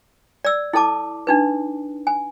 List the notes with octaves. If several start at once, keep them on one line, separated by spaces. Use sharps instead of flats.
D5 E6
E4 A4 A5 D6
D4 D#4 B4
G#5